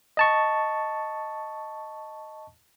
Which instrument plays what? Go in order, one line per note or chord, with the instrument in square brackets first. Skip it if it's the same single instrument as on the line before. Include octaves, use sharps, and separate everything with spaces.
[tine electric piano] D#5 A5 C#6